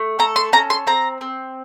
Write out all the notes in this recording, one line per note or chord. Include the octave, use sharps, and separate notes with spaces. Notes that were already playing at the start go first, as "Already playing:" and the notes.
Already playing: A3
A4 A#5
C6
C#4 A#5
C6
C4 A#5
C4